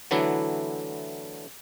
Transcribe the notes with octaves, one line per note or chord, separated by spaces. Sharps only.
D3 E3 F#3 A3 D4 E4